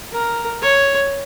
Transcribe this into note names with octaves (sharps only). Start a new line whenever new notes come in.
A#4
C#5